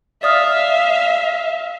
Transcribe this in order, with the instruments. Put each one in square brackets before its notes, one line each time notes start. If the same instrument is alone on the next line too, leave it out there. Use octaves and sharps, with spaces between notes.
[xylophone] D5 D#6 F6 [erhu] E5 [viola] F5